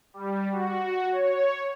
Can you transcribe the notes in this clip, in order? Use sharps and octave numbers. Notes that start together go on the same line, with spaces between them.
G3
F#4
C#5